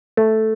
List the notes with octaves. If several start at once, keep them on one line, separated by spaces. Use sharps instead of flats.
A3